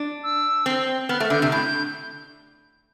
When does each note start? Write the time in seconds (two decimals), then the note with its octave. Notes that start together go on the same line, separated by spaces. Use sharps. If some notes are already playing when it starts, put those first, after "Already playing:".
Already playing: D4
0.24 E6
0.66 C4
1.09 B3 F6
1.20 A3
1.30 D3 G6
1.42 C3
1.52 A2 G6